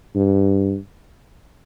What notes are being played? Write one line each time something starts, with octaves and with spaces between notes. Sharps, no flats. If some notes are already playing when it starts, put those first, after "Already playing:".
G2